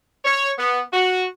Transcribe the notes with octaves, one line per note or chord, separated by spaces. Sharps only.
C#5
B3
F#4